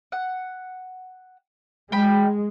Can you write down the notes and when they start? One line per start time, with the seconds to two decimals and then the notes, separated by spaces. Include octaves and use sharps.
0.12 F#5
1.92 G#3 G5 B5